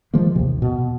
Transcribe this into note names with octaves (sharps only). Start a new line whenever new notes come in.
E3 F3 G#3 A#3
D#2 C3
B2